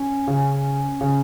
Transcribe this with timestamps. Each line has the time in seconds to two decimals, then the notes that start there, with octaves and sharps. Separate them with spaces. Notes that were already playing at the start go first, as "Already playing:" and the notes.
Already playing: C#4
0.28 C#3
1.01 C#3